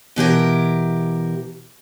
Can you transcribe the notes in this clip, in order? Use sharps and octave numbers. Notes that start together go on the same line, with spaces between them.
B2 E3 G4 A#4